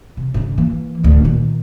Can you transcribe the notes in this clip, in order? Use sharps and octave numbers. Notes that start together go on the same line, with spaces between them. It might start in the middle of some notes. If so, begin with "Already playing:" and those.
C3
G#2 C#3
E3 A#3
D1 D2
A#2 D#3